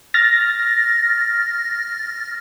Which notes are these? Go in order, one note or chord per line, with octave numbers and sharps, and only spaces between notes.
F6 A6 A#6